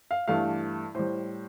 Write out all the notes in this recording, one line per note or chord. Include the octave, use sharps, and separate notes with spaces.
F5
G2 E3 A3 F5
A2 G3 C5